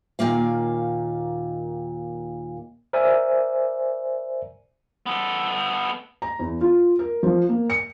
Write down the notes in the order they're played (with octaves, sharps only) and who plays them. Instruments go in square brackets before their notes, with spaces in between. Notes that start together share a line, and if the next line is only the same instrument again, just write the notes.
[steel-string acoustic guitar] D#2 A#2 D#3 A#3 F5
[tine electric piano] A#4 C5 D5 E5 G#5
[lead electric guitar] B3 A4
[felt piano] A#5
E2
F4
A#4
F3
A#3
C#7